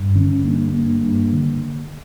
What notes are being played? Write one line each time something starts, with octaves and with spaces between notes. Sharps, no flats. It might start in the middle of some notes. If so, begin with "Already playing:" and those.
Already playing: G2
D3 C#4
G2 A#3
G2 A#3
G2
D3